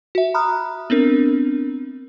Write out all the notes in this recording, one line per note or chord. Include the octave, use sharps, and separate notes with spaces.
F#4 E5
A#5 B5 D#6 F6 F#6
B3 C4 D4 A#4